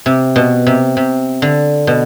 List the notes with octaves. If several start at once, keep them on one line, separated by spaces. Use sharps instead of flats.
C3
B2
C3
C3
D3
B2